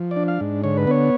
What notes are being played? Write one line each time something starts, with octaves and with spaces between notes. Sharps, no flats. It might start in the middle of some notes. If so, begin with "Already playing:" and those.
Already playing: F3
D5
D4
F5
G#2
D3 C#5
B4
B3 C#5